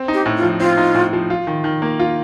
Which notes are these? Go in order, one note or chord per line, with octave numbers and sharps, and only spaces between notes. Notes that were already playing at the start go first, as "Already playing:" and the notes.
Already playing: C4
D#4
G4
A2
F4
F3
C4 F4
D#4
A2
F3
F4
D#3
D#3
A#3
F4